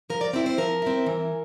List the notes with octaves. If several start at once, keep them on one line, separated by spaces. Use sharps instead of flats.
F3 A#4
D5
C4 E4 D5
C5
F3 A#4
C4 E4
E3